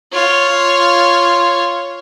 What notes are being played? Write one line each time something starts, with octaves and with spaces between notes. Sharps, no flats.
F4 C#5